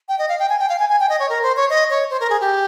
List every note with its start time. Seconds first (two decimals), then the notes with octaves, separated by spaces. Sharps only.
0.09 G5
0.19 D#5
0.29 F5
0.39 G5
0.49 G#5
0.59 G5
0.69 F5
0.79 G#5
0.89 G#5
1.00 G5
1.09 D#5
1.20 C#5
1.29 A#4
1.43 C5
1.56 C#5
1.70 D#5
1.90 C#5
2.10 C5
2.20 A#4
2.30 G#4
2.41 G4